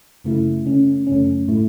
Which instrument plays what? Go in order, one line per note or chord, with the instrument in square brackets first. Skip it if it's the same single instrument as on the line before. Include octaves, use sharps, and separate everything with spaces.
[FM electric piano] F#2 C#3 A3 E4
C#3 A3 C#4
F#2 C#3 A3 C#4
A2 A3 E4